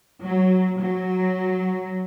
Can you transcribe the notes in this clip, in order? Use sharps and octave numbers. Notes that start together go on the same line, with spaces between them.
F#3
F#3